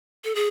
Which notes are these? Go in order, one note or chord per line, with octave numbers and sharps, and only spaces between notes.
A4
G#4